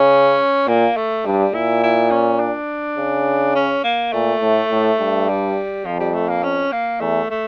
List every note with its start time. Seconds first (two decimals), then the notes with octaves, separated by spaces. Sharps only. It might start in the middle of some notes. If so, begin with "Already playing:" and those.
Already playing: C#3 C#4
0.67 A#2 A#3
0.97 A3
1.25 G2 G3
1.53 A#2 E4
1.83 E4
2.11 C#4
2.40 D4
2.98 C#3
3.55 C#4
3.84 A#3
4.13 A#2 A3
4.41 A2
4.71 A2
4.99 G2
5.28 G3
5.85 F2 F3
6.00 G3
6.14 A3
6.29 A#3
6.43 C#4
6.72 A#3
7.01 E2 A3
7.30 A3